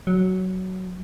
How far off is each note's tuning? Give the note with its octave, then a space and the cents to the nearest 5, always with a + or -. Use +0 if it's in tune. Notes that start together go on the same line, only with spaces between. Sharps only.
F#3 +10